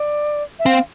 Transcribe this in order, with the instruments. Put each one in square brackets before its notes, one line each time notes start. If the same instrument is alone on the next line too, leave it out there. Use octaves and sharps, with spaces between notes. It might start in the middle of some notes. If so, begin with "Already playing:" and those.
Already playing: [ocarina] D5
E5
[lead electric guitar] C4 [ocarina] F5